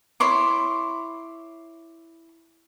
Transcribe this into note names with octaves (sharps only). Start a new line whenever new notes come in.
E4 C#5 C6 D6